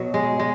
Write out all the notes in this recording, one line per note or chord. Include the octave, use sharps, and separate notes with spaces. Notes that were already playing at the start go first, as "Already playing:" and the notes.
Already playing: B2 F#3
G#3
G#3